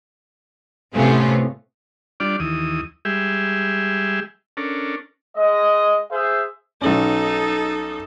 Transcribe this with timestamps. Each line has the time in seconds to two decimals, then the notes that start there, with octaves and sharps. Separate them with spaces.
0.94 A2 C3 A3 B3 C#4 F4
2.20 G3 D4 F4 D5
2.40 D#2 E3 D#6
3.05 G3 G#3 G4 G#4 E5
4.57 C#4 D4 A4 A#4
5.36 G#3 D#5
6.11 G#4 C5 E5
6.82 B1 C#4 D#4 A4